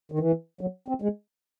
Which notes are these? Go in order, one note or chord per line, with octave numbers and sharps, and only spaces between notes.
D#3
E3
F#3
C4
G#3